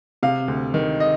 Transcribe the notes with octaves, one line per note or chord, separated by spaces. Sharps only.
C3 F5
D2
D#3
D#5